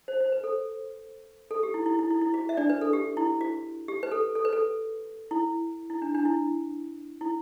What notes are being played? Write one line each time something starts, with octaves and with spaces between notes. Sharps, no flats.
C5
C5
B4
A4
A4
G4
E4
E4
E4
E4
E4
F#4
E5
D4 D5
B4
A4
G4
E4
F#4
G4
B4
A4
A4
B4
A4
E4
E4
D4
D4
E4
E4